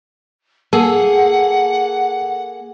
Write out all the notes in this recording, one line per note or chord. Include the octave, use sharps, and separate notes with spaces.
A#3 G#4 A4 F#5